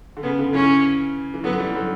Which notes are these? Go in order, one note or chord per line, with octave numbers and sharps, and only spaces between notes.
D3
C#3 B3
D3
C#3 E3 C#4
E3
D3 F#3 B3
E3 G3
D3 F#3